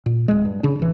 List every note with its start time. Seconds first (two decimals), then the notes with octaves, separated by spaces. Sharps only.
0.06 A#2
0.28 D1 G#3
0.45 G2
0.63 C#3 D4
0.79 A1 E3